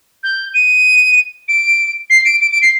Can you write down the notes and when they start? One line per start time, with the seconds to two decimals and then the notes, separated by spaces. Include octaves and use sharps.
0.23 G6
0.54 D#7
1.48 D7
2.10 C7
2.25 D7
2.41 D7
2.51 D7
2.62 C7